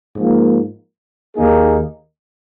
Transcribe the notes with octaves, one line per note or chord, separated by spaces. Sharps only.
G#2 F3 A#3
D#2 D#3 A#3 D#4 G#4